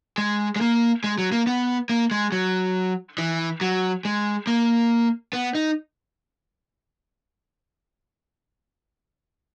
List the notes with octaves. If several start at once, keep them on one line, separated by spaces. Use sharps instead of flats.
G#3
G#3
A#3
G#3
F#3
A#3
B3
A#3
G#3
F#3
E3
F#3
G#3
A#3
B3
D#4